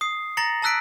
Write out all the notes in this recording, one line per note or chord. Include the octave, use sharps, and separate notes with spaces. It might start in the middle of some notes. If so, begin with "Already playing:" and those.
D#6 C7
A#5 A6 A#6 C#7 F#7
A5 A#5 E6 F#6 B6 D7